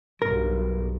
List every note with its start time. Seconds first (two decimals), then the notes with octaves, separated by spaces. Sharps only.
0.22 B1 G2 A#4